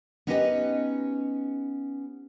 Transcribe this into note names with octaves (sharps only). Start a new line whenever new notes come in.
B3 C#4 D#4 G4 B4 D#5